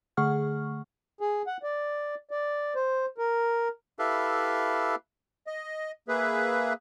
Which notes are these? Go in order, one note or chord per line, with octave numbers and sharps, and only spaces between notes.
D3 A3 G#4 F#5 C#6 F6
G#4
F#5
D5
D5
C5
A#4
E4 G4 A4 B4 E5 F5
D#5
A#3 G#4 B4 E5